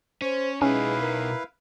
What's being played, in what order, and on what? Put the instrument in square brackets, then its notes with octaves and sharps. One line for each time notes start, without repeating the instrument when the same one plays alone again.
[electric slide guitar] C#4 [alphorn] C5 [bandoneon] C#5
[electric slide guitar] B2 D#4 [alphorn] G#3 [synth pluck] C#4 [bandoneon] E4 B4 F5
[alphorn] A#4